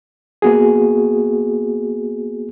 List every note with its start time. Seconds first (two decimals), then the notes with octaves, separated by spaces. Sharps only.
0.42 A#3 B3 F#4 G#4